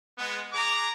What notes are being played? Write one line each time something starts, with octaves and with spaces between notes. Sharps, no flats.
G#3 B3
G#4 A#5 D6